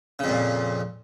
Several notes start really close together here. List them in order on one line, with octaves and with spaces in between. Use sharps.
C#3 F2 A#2